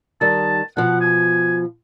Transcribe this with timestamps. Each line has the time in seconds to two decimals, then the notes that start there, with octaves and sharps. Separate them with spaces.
0.21 D#3 G3 A5
0.77 B2 F3 F#5
1.01 G#5